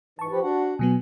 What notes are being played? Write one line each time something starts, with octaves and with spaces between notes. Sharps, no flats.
G#2 E3 A5 C#6
F3 G4 B4
D4 F#4 F#5
B2 F#3 B3 G#5